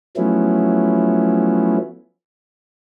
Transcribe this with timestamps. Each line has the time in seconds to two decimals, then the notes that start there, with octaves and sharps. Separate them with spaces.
0.17 F3 F#3 A3 B3 C#4 E4